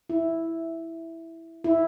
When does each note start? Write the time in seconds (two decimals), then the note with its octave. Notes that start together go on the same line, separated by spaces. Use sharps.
0.09 E4
1.64 E4